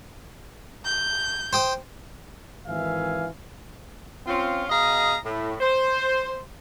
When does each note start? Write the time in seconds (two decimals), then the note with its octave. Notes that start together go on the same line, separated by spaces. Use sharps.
0.85 G6
1.53 C5 G5 D#6
2.67 G#1 D#3 E3 E5 F5 G#5
4.27 C4 C#4 F4
4.69 B2 G#4 D#5 F5 A#5
5.24 A2
5.60 C5